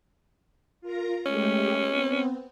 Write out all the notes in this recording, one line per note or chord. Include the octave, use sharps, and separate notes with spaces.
F4 A#4 A#5
G#3 A3 C#4 G4
B3 C4